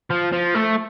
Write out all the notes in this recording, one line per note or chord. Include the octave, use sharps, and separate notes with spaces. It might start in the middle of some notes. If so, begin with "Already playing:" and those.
F3
F3
A3